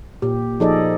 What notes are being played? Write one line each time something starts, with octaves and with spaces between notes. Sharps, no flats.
A#2 G4
F3 D#4 G#4 A4 D5 D#5